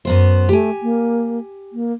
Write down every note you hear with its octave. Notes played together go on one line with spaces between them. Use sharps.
F#2 B3 C5
A3 G4 G#5
A#3
A#3